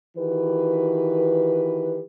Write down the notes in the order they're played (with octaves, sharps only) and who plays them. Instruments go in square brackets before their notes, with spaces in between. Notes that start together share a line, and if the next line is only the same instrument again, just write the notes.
[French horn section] D#3 E3 F#4 G4 B4